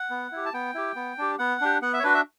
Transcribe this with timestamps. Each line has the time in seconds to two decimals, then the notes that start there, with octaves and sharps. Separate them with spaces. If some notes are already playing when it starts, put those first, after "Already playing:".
Already playing: F#5
0.10 B3
0.32 E4 G4
0.46 A5
0.54 B3 G5
0.75 E4 G4
0.96 B3
1.18 D4 G4
1.39 B3 F#5
1.61 D4 G4
1.82 B3 F#5
1.94 E5
2.00 C#5
2.03 D4 F#4 B4
2.15 E5